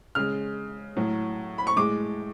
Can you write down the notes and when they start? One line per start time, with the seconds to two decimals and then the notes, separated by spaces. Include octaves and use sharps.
0.15 C#3 G#3 F6
0.96 A2 F#3
1.58 B5
1.67 C#6
1.76 A2 G#3 D6